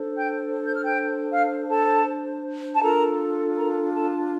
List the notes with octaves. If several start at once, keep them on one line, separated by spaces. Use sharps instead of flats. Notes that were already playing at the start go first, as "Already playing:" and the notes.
Already playing: D4 A4 C5
G5 G6
G6
F6
G5 G6
F5 F6
A4 A5
A5
D4 F4 A4 A#4 A#5
A#4 A#5
A4 A5